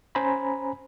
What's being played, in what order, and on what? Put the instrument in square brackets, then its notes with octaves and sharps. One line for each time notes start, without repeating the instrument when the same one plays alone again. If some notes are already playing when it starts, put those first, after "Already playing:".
[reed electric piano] C#4 C5 G#5 A#5 B5